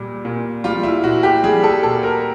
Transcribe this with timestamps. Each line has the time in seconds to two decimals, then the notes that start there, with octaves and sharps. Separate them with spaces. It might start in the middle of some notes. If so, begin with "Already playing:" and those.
Already playing: A#2 G3
0.25 A#2
0.64 G3 F4
0.83 E4
1.03 A#2 F#4
1.23 G4
1.44 G3 G#4
1.63 A4
1.83 A#2 A4
2.03 A#4